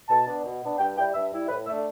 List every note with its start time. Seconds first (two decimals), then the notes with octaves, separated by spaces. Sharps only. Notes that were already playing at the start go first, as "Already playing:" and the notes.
0.08 B2 A5
0.26 B3 D4
0.44 B2
0.61 B3 D4
0.79 G2 G5
0.96 G3 E4 G5
1.14 G2 E5
1.31 G3 E4
1.49 A2 B4
1.66 A3 E5
1.69 D4